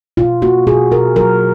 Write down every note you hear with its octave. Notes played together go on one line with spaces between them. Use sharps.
B2 F4
A#3 F#4
B2 G#4
B2 A#4
F#3 A#4